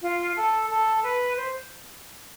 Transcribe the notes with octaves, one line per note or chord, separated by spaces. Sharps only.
F4
A4
A4
B4
C5